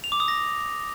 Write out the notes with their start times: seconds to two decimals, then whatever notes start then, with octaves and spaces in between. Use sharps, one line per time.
0.04 F7
0.12 D6
0.20 D#6
0.28 A#6